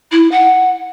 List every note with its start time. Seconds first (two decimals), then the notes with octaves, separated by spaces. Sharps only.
0.11 E4
0.31 F#5